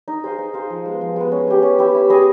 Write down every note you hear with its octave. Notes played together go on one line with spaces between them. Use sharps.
D#4
G#4 C5 F5
D#4
G#4 C5 F5
F3
G#3 B3
F3
G#3 B3
C#4
E4 G4
C#4
E4 G4
E4
G#4 B4 D#5